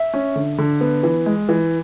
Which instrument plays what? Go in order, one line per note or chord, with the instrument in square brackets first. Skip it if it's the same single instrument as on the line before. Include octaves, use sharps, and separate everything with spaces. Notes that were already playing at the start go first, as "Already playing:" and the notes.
Already playing: [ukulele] E5
[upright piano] C#4
D3
D3
B3
E3
G#3
E3